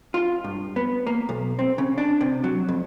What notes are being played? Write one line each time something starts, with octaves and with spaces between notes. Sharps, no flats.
F4
G2
B3
A#3
B1
C4
C#3
D4
C3
F#3
F2